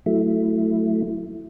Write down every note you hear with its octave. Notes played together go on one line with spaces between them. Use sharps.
F#3 A3 E4